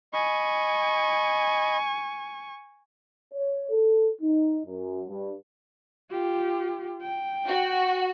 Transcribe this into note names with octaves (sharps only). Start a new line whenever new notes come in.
D#5 G#5 B5 C#6
C#5
A4
D#4
F#2
G2
F4 G4
G5
F#4